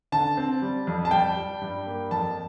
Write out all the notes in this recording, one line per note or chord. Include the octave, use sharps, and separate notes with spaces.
D3 A5
C4
G3
F2
A5
G3 G5
G3
G2
A#3
F2 A5